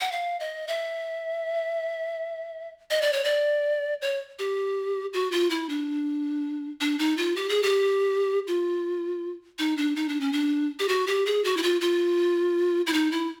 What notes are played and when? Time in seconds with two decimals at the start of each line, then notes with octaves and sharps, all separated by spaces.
0.01 F#5
0.12 F5
0.40 D#5
0.68 E5
2.91 D#5
3.02 D5
3.13 C#5
3.24 D5
4.02 C#5
4.39 G4
5.13 F#4
5.32 F4
5.50 E4
5.69 D4
6.81 D4
6.99 D#4
7.17 F4
7.36 G4
7.49 G#4
7.63 G4
8.47 F4
9.59 D#4
9.77 D4
9.96 D#4
10.09 D4
10.21 C#4
10.33 D4
10.79 G4
10.88 F#4
11.07 G4
11.26 G#4
11.44 F#4
11.57 E4
11.63 F4
11.81 F4
12.87 E4
12.93 D#4
13.12 E4